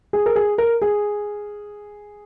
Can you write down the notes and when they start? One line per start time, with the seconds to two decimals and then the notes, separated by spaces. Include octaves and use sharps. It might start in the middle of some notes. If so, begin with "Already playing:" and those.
0.13 G#4
0.26 A#4
0.36 G#4
0.58 A#4
0.82 G#4